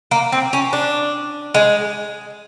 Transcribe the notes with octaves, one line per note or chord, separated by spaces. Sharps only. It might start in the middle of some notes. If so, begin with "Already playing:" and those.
A#3
C4
C#4
D4
G#3